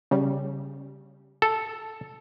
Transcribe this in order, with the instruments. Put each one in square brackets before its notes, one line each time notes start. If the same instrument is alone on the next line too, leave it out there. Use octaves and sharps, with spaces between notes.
[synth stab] C#3 G3
[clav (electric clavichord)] A4